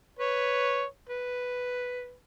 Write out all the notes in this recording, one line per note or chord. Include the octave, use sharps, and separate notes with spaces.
B4 C#5
B4